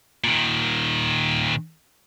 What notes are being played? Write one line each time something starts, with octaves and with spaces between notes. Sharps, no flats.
A#2 D#3